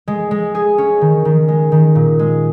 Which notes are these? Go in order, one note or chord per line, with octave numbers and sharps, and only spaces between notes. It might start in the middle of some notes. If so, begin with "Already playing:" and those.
G#3
G#3
G#4
C#4
D#3
D#3
G#3
D#3
A#2
G#3